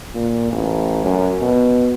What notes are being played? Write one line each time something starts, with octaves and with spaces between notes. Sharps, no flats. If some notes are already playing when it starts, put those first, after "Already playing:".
A#2
A1
F#2
B2